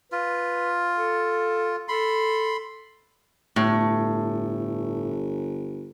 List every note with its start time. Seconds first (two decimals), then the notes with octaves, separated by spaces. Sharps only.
0.12 F4 B4
0.97 A4
1.88 A4 B5 C6
3.56 G1 A2